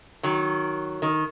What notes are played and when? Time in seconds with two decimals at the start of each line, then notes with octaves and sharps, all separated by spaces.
0.23 D#3 F#3
1.02 D#3